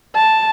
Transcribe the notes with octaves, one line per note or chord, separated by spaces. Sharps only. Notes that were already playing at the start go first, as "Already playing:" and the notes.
A5